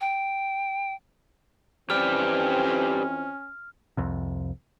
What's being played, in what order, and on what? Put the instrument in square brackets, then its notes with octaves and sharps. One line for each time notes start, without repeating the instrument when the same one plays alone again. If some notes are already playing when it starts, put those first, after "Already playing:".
[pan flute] G5
[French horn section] F2 E3 C4 [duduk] C#4 [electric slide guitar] G4 B4 D5 [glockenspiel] F6
[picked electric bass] C2 F2 C3